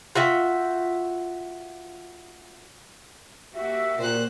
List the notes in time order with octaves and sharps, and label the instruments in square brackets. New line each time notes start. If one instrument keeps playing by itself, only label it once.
[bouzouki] F4 F#4 E5 G5
[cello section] A#3 F#4 G4 [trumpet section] E5
[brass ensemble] A#2 [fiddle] C5 F#6